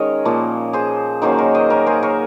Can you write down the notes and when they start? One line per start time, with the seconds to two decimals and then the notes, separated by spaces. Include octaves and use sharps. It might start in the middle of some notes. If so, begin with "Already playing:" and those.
Already playing: D#3 G#3 C#4 A#4 C#5 D#5
0.25 A#2 F3 A#3
0.73 G#4 C5
1.22 D#3 F#3 A#3 C#4 G#4 C5
1.38 A#4 C#5
1.54 C5 D#5
1.70 A#4 C#5
1.86 G#4 C5
2.03 A#4 C#5